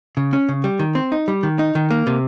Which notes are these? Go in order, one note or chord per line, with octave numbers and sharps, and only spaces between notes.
C#3
C#4
C#3
G3
D#3
C4
D#4
G3
D#3
D#4
D#3
A#3
C3